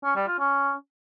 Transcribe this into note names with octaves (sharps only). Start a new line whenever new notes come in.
C#4
G3
F4
C#4